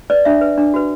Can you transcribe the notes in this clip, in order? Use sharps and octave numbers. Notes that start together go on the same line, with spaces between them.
B4 D5
D4 E5
B4
D4
F#4 B4